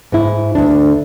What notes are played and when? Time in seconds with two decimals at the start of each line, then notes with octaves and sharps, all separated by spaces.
0.12 G#2 E4
0.55 D2 D4